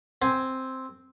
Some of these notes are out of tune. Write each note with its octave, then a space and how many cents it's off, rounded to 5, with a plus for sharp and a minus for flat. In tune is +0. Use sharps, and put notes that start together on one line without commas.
C4 +0 G#5 +0